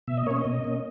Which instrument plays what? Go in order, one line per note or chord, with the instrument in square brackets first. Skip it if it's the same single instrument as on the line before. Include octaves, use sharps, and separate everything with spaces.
[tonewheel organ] B2 E5
D#5
A#3 C#4 C#5
D#5
B2
A#3 C#4